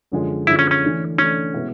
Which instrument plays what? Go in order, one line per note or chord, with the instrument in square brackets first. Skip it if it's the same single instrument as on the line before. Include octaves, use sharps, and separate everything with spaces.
[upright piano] F#2 D3 F3 G#3
[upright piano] F#2 D3 F3 G#3 [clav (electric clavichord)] E4
[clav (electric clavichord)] C#4
C#4
[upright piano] E3 A3 D4
[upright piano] E3 A3 D4 [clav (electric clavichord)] C#4
[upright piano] B2 G#3 B3 E4